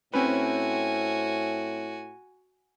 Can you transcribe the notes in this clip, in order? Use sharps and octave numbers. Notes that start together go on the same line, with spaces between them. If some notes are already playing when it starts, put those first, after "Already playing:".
A2 C4 C#4 F#4 B4 G#5